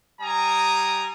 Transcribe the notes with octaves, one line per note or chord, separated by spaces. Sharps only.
G3 G#5 A#5 D#6